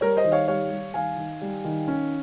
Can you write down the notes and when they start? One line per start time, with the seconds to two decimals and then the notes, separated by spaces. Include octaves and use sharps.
0.01 G3 A#4 C#5
0.17 C5 D#5
0.24 D#3
0.32 C#5 F5
0.48 G3 C#5 F5
0.72 G3
0.94 D#3 F5 G#5
1.17 D#3
1.41 G3
1.64 D#3
1.88 C#4